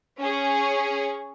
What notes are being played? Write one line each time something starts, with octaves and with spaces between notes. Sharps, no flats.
C#4 G#4